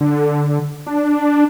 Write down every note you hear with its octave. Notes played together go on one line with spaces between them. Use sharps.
D3
D4